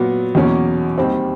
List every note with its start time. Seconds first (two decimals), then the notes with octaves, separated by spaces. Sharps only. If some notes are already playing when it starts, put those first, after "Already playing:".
Already playing: A#2 F#3 B3
0.35 E2 B2 F#3 A#3 C#4
0.98 D#2 D#3 G3 C4